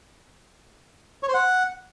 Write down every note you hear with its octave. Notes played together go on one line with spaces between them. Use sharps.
C#5
C5
F#5